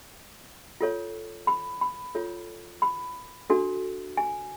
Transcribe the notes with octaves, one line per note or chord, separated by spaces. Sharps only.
F4 A4 C#5
B5
B5
F4 A4 C#5
B5
D4 F#4 A4
G#5